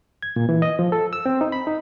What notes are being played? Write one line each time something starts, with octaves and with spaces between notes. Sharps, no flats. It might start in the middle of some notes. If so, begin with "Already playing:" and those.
G#6
A#2
E3
D#5
F3
A4
E6
C4
D#4
B5
D#4